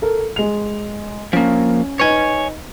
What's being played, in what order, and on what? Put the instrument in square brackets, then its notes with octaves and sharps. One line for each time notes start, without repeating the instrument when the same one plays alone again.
[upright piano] A4 A#4
G#3 F7
[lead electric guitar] F3 A#3 [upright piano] C#4
[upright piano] D#4 B4 [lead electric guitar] C#5 G#5